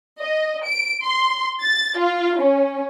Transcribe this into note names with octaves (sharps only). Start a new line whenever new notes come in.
D#5
D7
C6
A6
F4
C#4